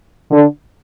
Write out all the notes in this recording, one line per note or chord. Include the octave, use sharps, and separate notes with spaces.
D3